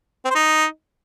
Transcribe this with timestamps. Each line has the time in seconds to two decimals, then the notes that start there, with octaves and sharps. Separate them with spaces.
0.25 C4
0.30 C5
0.35 D#4